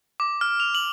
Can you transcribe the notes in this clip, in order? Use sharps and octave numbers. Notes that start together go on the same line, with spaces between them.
D6
F6
F7
F#7